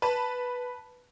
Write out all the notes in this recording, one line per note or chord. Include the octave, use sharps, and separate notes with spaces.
B4 A5